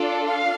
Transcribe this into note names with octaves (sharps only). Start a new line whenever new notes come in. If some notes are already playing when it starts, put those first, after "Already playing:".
Already playing: D4 F4 A4 D5
F5